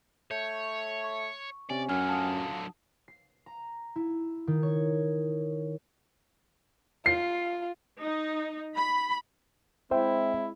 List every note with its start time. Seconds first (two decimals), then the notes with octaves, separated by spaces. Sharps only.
0.31 A3 C#5 G6 C#7
1.04 C#6
1.70 C3 C#4 D5 G#5
1.89 F#2 D3 F#3 G#5 F6 G#6
2.09 F4 A5 D#6
3.08 C7
3.46 A#5
3.96 E4
4.47 D#3
4.63 C#5
7.06 F4 C7
8.01 D#4
8.76 B5
9.91 G#3 C4 E4 C5 E5 G5